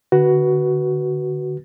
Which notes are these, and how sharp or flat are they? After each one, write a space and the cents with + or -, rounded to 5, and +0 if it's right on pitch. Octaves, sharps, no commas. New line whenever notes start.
D3 +0 F#4 +10 B4 -15